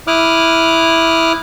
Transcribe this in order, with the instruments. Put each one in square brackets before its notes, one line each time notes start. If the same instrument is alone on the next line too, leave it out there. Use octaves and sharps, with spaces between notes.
[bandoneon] E4 D6 D#6 F6 F#6